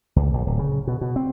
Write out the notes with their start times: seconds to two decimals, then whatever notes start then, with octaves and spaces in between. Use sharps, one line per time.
0.16 C#2
0.33 A#1
0.47 D1
0.59 C#3
0.87 B2
1.01 B2
1.16 C4